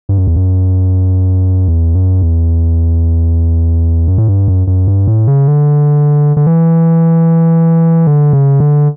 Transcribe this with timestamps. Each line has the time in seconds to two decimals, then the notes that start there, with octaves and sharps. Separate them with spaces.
0.09 G2
0.18 F#2
0.27 E2
0.36 F#2
1.68 E2
1.95 F#2
2.22 E2
4.08 F#2
4.18 A2
4.28 G2
4.48 F#2
4.67 F#2
4.88 G2
5.07 A2
5.27 C#3
5.48 D3
6.37 D3
6.47 E3
8.07 D3
8.33 C#3
8.60 D3